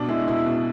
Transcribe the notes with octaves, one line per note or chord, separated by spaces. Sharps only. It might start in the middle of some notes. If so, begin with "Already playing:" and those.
Already playing: B2 D4
G#3 E4
B2 E4
B2